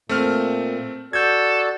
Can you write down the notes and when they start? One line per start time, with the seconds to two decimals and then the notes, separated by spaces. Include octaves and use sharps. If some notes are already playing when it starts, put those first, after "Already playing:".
0.09 A#2 A3 C4 F6
1.13 F#4 A4 D5 G6 G#6